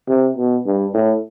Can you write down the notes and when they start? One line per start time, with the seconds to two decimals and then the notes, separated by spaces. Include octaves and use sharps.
0.09 C3
0.37 B2
0.66 G2
0.94 A2